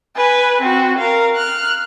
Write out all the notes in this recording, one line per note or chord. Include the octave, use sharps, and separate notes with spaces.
B4 G#5
C4 F#4
A#4 F5
F6 F#6